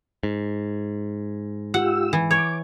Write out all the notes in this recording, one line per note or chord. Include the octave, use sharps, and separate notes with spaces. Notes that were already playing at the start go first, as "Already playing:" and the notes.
G#2
F4 G4 F#5 E6
E3
C#5 D6